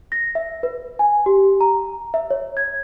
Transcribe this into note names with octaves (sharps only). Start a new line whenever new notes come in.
A#6
E5
B4
G#5
G4
A#5
E5
C#5
G#6